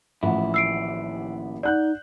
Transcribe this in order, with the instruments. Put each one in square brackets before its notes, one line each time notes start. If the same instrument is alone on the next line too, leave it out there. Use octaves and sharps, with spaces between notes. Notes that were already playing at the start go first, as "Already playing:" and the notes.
[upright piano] A1 F3 F#5 [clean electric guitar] D#2 E4
[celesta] E6 C7 D7
[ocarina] D#4 [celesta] D5 [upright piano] F#5 F#6 G6